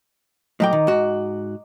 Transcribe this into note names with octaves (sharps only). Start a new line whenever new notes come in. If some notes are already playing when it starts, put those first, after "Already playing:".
A2 F#3 D#5 G5 A#5 D6
D#3
G#2 F#4